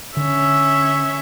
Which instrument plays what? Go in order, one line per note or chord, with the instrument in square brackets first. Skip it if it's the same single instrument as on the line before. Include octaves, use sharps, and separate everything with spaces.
[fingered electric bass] D3 [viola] C#4 E5